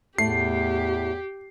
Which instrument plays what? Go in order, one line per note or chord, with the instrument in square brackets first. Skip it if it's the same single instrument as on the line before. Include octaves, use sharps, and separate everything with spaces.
[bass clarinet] E2 [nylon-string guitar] A2 A3 [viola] G4 [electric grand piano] C7